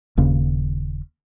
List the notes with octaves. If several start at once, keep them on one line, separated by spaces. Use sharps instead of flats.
D#1 D#2 C#3